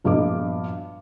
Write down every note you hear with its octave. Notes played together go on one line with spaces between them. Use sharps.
A#1 G2 B3 F#4 D#5 D6